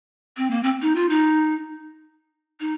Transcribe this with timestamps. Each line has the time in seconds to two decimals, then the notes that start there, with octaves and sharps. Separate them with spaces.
0.37 C4
0.50 A#3
0.63 C4
0.82 D#4
0.95 F4
1.09 D#4
2.60 D#4